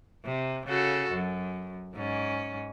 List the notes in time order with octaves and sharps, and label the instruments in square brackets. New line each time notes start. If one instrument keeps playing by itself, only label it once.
[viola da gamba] C3
C#3 F#4 A4
F#2
G#2 C#4